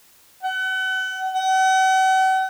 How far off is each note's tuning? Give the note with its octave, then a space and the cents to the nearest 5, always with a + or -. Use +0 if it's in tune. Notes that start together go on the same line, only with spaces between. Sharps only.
F#5 +35
F#5 +40